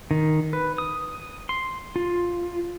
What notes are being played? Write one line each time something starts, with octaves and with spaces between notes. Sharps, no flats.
D#3
B4
D#6
C6
F4